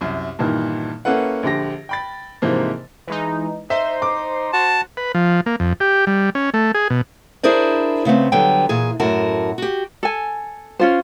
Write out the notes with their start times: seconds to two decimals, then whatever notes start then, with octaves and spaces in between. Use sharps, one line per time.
0.01 C2 F#2
0.39 G2 A#2 D#3 E3
1.05 A#3 C#4 E4 A4 B4 F#5
1.43 A#1 D3 G4 A#6
1.89 G5 B5 A6
2.42 G#2 C3 E3 F3 A#3
3.07 E3 G#3 D#4
3.70 D#4 C5 E5 C6
4.02 D6
4.53 F#4 A5
4.97 B4
5.15 F3
5.46 A#3
5.60 F2
5.80 G4
6.07 G3
6.35 C#4
6.54 A3
6.75 G#4
6.90 B2
7.43 D4 E4 G#4 A#4 C5 D5
8.05 C#3 A3 B3 C4
8.32 D3 F#3 G3 B3 G5
8.69 A#2 E3 G#4
9.00 F#2 A2 F#4 A#4 A5
9.58 F#4 G4
10.03 A4 G#5
10.79 C#4 F4 C5